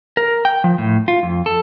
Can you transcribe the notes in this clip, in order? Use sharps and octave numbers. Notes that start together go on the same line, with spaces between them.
A#4
G5
F3
A2
F4
F2
A4